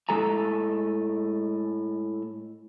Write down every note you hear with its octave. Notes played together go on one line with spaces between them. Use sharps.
A2 G#3 A4 G#5 A#5